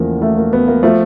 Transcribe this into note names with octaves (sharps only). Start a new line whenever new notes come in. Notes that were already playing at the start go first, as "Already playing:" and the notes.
Already playing: E2 C#3 F3 A3 A#3
A3
A#3
B3
A#3
F3 A3